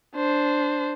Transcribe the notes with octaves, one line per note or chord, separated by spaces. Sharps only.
D4 C5